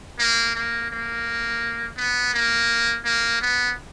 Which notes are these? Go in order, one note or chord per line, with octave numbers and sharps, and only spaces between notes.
A#3
A#3
A#3
B3
A#3
A#3
B3